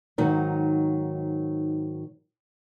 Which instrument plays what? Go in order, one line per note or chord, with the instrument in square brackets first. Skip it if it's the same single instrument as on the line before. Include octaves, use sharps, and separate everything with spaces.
[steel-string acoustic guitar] G#2 D#3 F#3 D#4